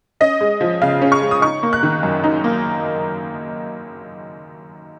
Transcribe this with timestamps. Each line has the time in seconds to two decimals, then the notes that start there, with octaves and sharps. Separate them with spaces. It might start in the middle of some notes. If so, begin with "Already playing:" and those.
0.20 C#4 D#5
0.41 G#3
0.61 F3
0.82 C#3 F5
1.02 C#4
1.12 C#6
1.22 G#3
1.31 D#6
1.42 D#4 C#6
1.63 A#3
1.73 F#6
1.83 D#3
2.03 F#2
2.24 D#4
2.44 A#3